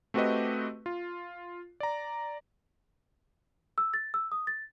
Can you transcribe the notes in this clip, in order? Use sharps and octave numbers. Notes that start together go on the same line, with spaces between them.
A3 C4 F#4 G4 B4 D#5
F4
D5 A#5
E6
A6
E6
D#6
A6